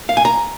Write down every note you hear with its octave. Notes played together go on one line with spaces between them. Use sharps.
F5
G#5
A#5